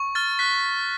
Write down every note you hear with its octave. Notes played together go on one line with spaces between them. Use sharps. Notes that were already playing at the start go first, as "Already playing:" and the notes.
Already playing: C#6
F6 A6
F#6 B6